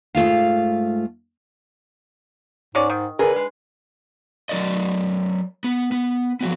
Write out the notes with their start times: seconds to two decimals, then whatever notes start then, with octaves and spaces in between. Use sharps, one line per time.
0.15 G#2 A3 F4 F5
2.75 G#2 G#3 C#4 D5
2.90 D#3
3.19 D3 G#4 A#4 B4
3.36 G#3
4.49 F#3 A#4 D5 D#5
5.64 B3
5.92 B3
6.41 F3 F#3 B3